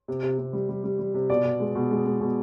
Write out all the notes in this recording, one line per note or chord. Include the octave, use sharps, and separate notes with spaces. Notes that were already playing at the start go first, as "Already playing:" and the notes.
C3
C3
C3
G3
G3
G3
G3
C3
B2 D5
B2
G#3
B2
G#3
G#3
B2